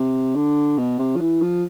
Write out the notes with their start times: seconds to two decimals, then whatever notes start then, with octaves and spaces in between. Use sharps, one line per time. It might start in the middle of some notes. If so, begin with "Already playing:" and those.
Already playing: C3
0.36 D3
0.78 B2
0.99 C3
1.16 F3
1.20 E3
1.42 F3